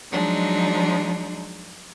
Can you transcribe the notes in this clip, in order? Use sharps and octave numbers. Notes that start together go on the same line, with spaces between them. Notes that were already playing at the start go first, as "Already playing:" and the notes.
F3 F#3 G#3 D4 D#4